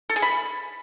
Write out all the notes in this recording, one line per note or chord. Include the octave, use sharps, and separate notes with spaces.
A4
G#4
B5